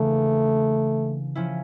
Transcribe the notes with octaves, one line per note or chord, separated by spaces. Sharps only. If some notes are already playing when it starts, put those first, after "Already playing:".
Already playing: C#3 E3 A3 A#3 D4
F3 C#4 E4